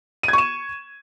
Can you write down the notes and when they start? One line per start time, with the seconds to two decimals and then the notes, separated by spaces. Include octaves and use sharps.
0.23 D#7
0.28 G#6
0.33 C#6
0.38 E7